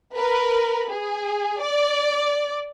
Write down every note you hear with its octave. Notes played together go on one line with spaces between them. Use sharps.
A#4 B4
G#4
D5